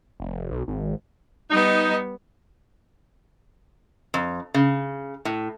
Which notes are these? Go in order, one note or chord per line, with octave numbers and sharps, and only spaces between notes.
F1
B1
G#1
G3 B3 D#4
F2
C#3
A2